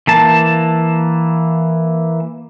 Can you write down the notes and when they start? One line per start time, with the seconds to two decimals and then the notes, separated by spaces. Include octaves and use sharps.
0.07 E3 A#3 A5